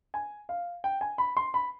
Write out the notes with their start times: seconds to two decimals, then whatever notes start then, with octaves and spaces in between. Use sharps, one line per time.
0.14 G#5
0.49 F5
0.84 G5
1.01 G#5
1.18 B5
1.37 C6
1.54 B5